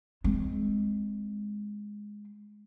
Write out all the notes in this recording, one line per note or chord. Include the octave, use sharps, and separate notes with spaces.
G#3 C4